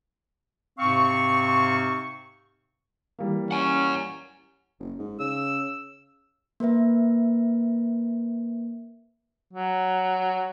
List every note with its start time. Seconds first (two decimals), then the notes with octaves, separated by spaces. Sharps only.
0.79 G#2 C3 C4 F5 C#6
3.19 E3 G3 A#3
3.51 C#4 F#5 G#5
4.80 F#1
4.99 G#2
5.19 C#3 E6
6.60 A#3 A#4 B4 E5
9.53 F#3